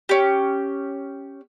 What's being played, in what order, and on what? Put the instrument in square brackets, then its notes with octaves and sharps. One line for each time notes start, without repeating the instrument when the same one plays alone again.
[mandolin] C#4 G4